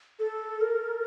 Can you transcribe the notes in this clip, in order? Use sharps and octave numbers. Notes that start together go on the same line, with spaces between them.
A4
A#4